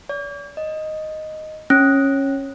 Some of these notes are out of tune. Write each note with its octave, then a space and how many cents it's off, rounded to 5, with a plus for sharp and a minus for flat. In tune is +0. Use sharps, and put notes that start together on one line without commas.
D5 -45
D#5 +0
C#4 -15